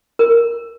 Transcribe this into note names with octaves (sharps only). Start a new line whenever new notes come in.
A#4